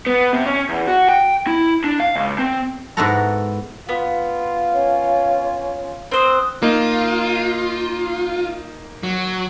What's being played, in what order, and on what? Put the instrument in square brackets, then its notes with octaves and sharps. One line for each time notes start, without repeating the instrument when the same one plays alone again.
[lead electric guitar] B3
C3
C#4
E2
F#4
G5
E4
D4
F5
C#2
C4
[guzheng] G#2 B3 E4 F#4 A4 A#5
[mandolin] B3 [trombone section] F4
[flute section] C#4 C#5
[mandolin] C4 C5 [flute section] D#6 F#6
[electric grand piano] A#3 D#4 [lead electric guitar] F4
[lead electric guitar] F#3